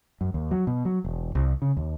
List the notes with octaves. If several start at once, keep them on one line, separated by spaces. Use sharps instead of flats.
F#2
D#2
F#3
B2
F#3
E1
C2
C#3
D#2